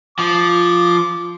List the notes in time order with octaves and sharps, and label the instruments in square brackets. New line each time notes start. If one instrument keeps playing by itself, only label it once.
[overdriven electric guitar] F3 [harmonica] D6